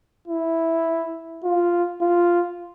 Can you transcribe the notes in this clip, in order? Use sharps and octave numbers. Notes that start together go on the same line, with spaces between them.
E4
F4
F4